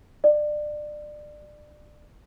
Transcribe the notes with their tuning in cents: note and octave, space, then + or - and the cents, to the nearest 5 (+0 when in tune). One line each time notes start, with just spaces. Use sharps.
D5 +25